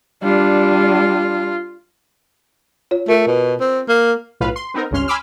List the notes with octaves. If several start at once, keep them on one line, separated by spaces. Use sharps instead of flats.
G3 D4 F4
F4 C#5
A3 F4 A#4
B2
C4
A#3
B1 A2 F4 B4 F5
C6
B3 C4 D#4 A#4
G#1 C#2 G2 C#4 C6 F6
G#5 B5 C6 D6 E6 F6